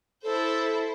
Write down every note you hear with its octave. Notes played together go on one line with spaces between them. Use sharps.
E4 A4 C5